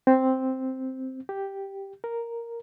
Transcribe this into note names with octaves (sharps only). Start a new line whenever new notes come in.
C4
G4
A#4